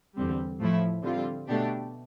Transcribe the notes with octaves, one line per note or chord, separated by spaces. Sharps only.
E2 D3 G3 C4
A2 F3 A3 E4
D3 G3 C4 F4
B2 A3 D4 G4